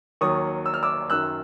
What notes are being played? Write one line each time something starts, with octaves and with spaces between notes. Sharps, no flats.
D#2 D#3 F#3 C#6 D#6
E6
F6
D6 E6
F#2 D#3 F#3 E6 F#6